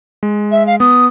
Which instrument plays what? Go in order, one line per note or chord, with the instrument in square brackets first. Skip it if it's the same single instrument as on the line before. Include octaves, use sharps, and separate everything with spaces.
[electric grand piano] G#3
[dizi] E5
F5
[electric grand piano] B3 [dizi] D#6